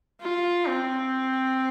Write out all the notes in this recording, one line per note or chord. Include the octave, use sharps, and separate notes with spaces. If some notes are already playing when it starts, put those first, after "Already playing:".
F4
C4